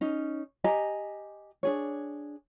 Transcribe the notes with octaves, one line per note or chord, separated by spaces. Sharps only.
C#4 D#4
G4 D#5 G#5 A#5
D4 G#4 C#5